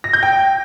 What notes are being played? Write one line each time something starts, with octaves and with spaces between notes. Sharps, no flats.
A#6
G6
G5